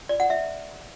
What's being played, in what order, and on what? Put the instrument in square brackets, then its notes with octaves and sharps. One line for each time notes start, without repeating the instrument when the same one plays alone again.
[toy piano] D5
F#5
E5